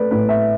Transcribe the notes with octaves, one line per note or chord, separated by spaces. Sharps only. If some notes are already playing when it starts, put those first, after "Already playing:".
Already playing: A3 B4 D5
A2 B4
E5